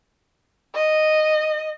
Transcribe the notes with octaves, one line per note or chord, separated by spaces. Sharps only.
D#5